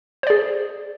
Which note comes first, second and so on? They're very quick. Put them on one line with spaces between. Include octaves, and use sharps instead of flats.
C5 D5 G#4